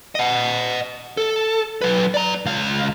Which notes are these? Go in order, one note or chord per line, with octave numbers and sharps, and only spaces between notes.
D#5 F#5
A4
F#3 B4
D5 A#5
C#2 F5